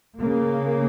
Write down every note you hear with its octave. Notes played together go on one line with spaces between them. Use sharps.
C#3 A#3